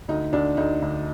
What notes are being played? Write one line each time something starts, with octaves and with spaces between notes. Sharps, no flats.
D2 D#4
D2 D4
D2 D#4
D2